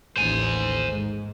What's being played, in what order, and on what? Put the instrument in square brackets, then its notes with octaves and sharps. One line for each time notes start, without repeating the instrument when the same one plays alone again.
[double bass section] A1 D#2 [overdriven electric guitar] C5 G#5
[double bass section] G#2